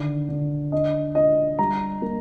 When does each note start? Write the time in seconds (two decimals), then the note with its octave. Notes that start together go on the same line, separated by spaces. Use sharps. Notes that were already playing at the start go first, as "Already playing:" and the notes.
Already playing: D3 D#3
0.29 D3
0.72 D4 D#5
1.15 D4 D#5
1.59 G3 A#5
2.02 A#3